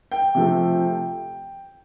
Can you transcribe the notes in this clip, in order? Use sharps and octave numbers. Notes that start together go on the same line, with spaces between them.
G5
C3 F3 A3